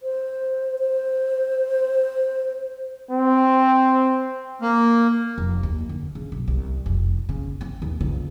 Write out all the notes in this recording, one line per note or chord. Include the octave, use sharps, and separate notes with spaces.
C5
C5
C4
A#3
F1
D#2
D3
C#3
B1
C2
F1
C#3
C4
D#2
C#2